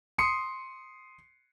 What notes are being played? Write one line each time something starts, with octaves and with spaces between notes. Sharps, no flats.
C6 D#6 C7 C#7